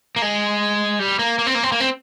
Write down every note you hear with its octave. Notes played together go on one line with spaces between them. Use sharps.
A#3
G#3
G3
A#3
A#3
C4
A#3
C4
A#3
C4